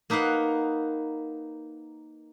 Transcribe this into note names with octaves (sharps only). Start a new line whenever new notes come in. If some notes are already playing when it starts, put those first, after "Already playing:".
A#3 D#4 B4 F5 F#5